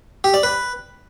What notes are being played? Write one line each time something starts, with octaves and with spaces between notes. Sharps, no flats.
G4
D5
B4